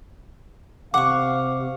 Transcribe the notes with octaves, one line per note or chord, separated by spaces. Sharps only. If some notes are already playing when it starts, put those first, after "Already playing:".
C3 F5 F#5 C#6 D6